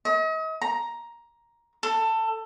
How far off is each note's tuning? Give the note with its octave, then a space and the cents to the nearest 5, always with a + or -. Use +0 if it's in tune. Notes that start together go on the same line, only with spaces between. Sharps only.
D#5 +40
A#5 +10
A4 +20